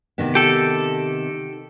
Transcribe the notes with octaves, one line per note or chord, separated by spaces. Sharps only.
C3 D#3 B3
G4 A4